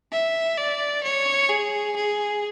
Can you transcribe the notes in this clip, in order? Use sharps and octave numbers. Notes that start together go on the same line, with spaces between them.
E5
D5
C#5
G#4
G#4